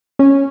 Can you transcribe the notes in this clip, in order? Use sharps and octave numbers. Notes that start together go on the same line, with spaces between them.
C#4